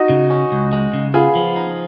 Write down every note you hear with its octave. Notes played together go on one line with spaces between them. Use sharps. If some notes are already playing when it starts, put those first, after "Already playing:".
Already playing: D#4 F#4
C#3
C#4
C#2
G#3
C#3
B3 F4 G#4
F3
D#4